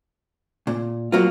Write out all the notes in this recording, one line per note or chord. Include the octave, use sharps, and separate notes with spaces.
A#2
F#3 A#3 F4